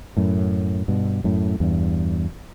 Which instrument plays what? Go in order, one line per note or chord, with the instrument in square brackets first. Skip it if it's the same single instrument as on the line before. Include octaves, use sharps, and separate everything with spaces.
[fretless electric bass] F#2 A2
G2 B2
F#2 A2
E2 G2